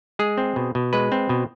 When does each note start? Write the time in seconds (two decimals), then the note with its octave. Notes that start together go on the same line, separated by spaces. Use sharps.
0.19 G#3 G#4
0.38 C4
0.56 B2
0.75 B2
0.93 G#3 B4
1.12 C4
1.29 B2